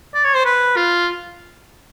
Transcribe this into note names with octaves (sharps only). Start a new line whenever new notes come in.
D5
C#5
C5
B4
F4